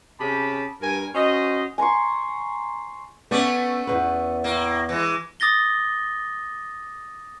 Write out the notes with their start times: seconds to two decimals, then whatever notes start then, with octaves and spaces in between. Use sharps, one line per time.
0.20 C3 C#4 G4 G#4 A5 B5
0.81 G2 A#4 G#5
1.15 C#4 F#4 C5 D#5
1.78 G#5 A#5 C6 C#6
3.31 A3 B3 C#4 D5
3.87 E2 B2 B4
4.44 A2 A#3
4.89 E3 G#3
5.40 D6 D#6 A6 A#6 G7